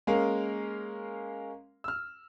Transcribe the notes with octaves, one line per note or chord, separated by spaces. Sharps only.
G#3 A#3 C#4 A#4 F5
E6 F6